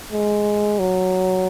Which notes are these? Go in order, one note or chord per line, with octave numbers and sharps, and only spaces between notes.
G#3
F#3